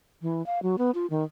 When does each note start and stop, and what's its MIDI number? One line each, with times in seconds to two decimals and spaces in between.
0.22 0.45 52
0.46 0.62 77
0.63 0.76 54
0.78 0.91 59
0.95 1.06 65
1.10 1.24 51